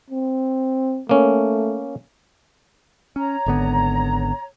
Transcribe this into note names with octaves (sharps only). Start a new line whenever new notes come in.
C4
A3 A#3 C#4
C#4 C#5 A#5
G#1 D3 B3